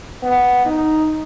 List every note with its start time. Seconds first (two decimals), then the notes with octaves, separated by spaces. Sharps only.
0.23 B3
0.66 D#4